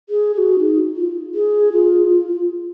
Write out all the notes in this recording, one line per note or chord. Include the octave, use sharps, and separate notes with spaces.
G#4
G#4
F#4
D#4
F4
G#4
F4
F4
F4